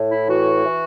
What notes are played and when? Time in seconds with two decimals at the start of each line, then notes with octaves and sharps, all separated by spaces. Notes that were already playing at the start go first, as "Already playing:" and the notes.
Already playing: A2
0.10 E4
0.28 E3 F#4
0.65 E3